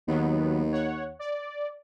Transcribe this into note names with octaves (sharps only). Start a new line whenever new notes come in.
D#2 D#3 F#3 B3
C#5 F#5
D5